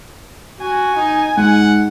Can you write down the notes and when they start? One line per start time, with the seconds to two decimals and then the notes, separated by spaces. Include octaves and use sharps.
0.61 F#4 G#5
0.96 D#4
1.37 G#2 F#5